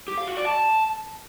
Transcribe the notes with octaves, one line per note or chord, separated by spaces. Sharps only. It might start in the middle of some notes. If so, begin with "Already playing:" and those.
G4
F5
F#4
D5
A5